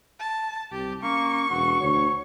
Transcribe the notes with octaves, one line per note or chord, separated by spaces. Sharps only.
A5
C2 G4
A#3 C#4 C#6
E1 F#4
D2 C#5